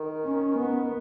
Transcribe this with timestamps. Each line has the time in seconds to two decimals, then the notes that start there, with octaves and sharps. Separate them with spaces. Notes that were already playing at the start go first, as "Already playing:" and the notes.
Already playing: D#3
0.25 C#4
0.58 B3